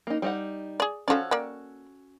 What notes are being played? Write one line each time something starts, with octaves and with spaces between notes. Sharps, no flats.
A#3 D#4
G3 D#4 F#5
G#4 D5
F3 C#4 F#4 A4 D5
A#3 D5 G5